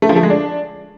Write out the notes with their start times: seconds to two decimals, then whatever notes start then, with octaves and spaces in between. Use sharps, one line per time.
0.02 A3
0.09 F3
0.16 A3
0.23 G#3
0.30 D4